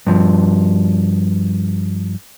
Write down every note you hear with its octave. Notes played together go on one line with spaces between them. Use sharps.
G2 F3